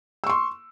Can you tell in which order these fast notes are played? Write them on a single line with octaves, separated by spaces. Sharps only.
E6 C#6 C6